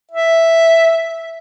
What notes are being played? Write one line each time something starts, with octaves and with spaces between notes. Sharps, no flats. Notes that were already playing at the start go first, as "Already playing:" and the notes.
E5